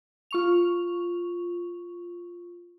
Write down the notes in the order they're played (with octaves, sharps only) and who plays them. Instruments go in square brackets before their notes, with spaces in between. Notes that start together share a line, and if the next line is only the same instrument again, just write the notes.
[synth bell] F4 C#6 F7